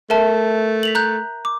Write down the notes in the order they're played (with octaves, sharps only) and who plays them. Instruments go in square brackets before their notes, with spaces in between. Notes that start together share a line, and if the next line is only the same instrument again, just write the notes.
[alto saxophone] A3 [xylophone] A#4 E5 A5
[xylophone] B6 F7 F#7
A#5 F#6 G6
D6